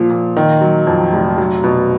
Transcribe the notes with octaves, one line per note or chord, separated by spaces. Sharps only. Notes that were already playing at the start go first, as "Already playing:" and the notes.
Already playing: A#2 F3
A#2
D#3
F#3
F2
F1
F#3
B2